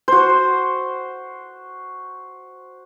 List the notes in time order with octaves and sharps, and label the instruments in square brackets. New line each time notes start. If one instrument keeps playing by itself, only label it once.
[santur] F#4 C5